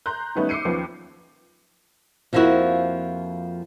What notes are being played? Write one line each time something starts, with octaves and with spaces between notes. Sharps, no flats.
A#5 C6 F#6 G6
D#3 G3 A3 B3 C#4 D#4
D6 E6 G6 C7 C#7 D#7
D#2 F3 B3 C#4
F2 F3 A#3 D#4 E4 F#4